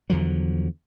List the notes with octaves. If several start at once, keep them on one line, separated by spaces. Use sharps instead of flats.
E2 D3 F3 F#3